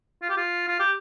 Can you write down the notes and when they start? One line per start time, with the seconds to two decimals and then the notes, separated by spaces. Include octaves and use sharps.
0.22 F4
0.30 G4
0.37 F4
0.68 F4
0.79 G4